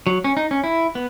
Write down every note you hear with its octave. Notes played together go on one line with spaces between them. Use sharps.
F#3
C#4
D#4
C#4
E4
B3